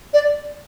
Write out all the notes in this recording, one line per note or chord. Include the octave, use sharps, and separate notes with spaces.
D5